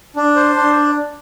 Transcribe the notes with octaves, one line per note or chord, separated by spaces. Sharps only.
D4
C5
D4